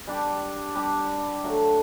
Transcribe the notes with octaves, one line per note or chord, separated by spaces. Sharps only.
G3 D4 G4
G3 D4 G4
D3 F#3 A3